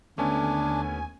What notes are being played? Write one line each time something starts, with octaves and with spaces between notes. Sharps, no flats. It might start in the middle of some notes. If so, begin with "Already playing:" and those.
D#2 D3 A3 B3 C#4 D4 G#5